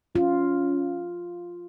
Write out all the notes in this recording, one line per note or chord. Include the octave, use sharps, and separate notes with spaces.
C#4 F4